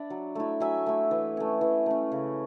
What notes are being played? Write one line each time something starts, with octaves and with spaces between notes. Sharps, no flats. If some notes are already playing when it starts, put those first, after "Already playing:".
Already playing: D4 D5 E5 B5
F#3
A3 E4
F#3 E5 G#5
A3 E4
E3
A3 C#4
E3
A3 C#4
C#3